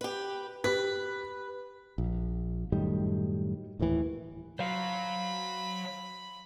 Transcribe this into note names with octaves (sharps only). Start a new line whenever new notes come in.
G4 B4
G4 B4 B6
A#1
F#2 A2 D#3 G3
D#1 D#2 A2 E3
F#3 C5 F5 B5